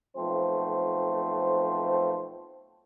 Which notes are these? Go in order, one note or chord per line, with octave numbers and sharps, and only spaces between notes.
B1 F3 A3 C4 C5